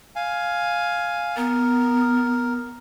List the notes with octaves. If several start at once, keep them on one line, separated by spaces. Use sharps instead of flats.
F5 G#5
B3 A#4